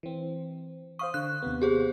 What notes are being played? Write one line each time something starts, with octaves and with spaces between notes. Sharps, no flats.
E3 C4
C5 F5 C#6 D#6
D3 F#6
D#2 C3 B3
G4 G#4 C5